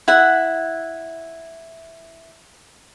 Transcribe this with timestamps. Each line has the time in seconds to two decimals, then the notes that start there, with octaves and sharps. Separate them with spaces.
0.08 E4 F#5